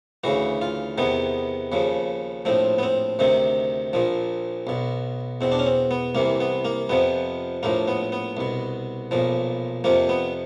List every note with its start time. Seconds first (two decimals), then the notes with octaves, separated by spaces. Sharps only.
0.24 D2 C#3 E3 F#4
0.62 F4
0.98 E2 C3 D#3 B3
1.72 D#2 C#3 F3
2.45 A#1 A2 F3 C4
2.78 B3
2.83 C4
3.19 D2 C3 D#3 C4
3.93 A#1 A#2 F3
4.67 B1 B2
5.41 E2 B2 C4
5.52 D4
5.59 C#4
5.66 C4
5.91 B3
6.15 C2 C3 E3 A#3
6.40 B3
6.65 A#3
6.89 F2 C3 F3 B3
7.63 A#1 A2 F3 A#3
7.88 B3
8.12 B3
8.37 C2 B2
9.11 B1 A#2 F3
9.84 F2 C3 F3 A#3
10.09 B3